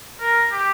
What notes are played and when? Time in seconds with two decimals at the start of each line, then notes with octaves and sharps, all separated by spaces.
0.21 A#4
0.52 G4